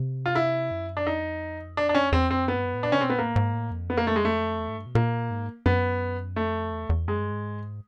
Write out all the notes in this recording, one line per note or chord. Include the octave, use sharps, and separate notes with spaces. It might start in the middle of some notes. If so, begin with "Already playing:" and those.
Already playing: C3
F4
E4
F#2
D4
F2 D#4
D4
D4
C#4
E2 C4
F2 C4
F#2 B3
G2
F#2
A2
A#2 D4
C#3 C#4
B2 C4
A#2 B3
A2 A#3
G#2
A2
F2
B3
A#3
A3
G#3
A3
E2
G#2
G2
B2
A#2 A#3
G#2
F#2 B3
F2 A3
E2
E2
F#2 G#3
G2
G#2